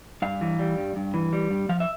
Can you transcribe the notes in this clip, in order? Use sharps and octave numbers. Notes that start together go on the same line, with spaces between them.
G2 F5
E3
G3
G2
G2
E3
G3
G2
F3 F5
E5